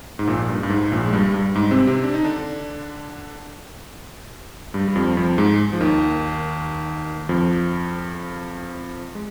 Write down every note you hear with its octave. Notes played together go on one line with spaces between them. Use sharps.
G#2
A#1 A#2
G2
G2
G#2
A#1 A#2
G#3
G2 G3
G2 G3
G#2 G#3
C3 C4
C3 C4
D4
D#4
D3 D4
G2 G3
G3
F2 F3
F2 F3
G#2 G#3
F3
D#2 D#3
F2 F3
G#3